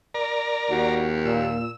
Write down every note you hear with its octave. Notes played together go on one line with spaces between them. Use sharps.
A#4 D5 A#5
D#2 F#4
A#2 E6